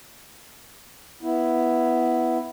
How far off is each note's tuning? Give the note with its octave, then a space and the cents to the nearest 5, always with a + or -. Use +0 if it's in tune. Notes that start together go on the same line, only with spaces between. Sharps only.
B3 +0 E4 +0